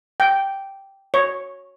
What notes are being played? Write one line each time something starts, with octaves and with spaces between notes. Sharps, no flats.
G5
C#5